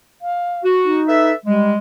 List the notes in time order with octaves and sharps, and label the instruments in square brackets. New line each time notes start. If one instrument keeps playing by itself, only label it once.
[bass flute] F5
[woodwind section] F#4
[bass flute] D#4
[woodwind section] A4 B4 E5
[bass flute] G3 [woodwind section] G#3